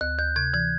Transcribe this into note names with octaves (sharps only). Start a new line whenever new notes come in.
D2 F#6
D2 G6
C3 G#6
E3 G#6